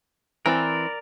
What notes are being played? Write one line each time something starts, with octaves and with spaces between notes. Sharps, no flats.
E3 C4 A#4 D5